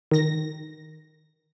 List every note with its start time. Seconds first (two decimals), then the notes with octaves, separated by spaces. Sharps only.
0.11 D#3 A#6